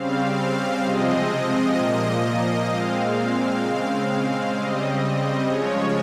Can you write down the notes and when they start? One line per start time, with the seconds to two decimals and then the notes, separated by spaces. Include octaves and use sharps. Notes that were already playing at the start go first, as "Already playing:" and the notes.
Already playing: C#3 G3 C4 F5
0.37 F5
0.84 C3 F3 G#3 C4 D#5
1.76 A#2 F3 A#3
2.68 A#2 G#3 C4 F5
3.61 C#3 G#3 C4
4.53 C#3 G3 C4 D#5
5.46 C#3 F3 G#3 C#5